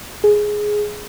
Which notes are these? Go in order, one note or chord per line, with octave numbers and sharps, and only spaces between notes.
G#4